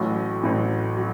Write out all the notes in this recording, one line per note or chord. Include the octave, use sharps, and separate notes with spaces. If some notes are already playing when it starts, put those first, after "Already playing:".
Already playing: A1 A2 F#3
A1 A2 F#3
F#3